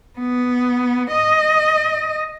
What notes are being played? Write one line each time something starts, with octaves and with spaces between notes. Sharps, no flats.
B3
D#5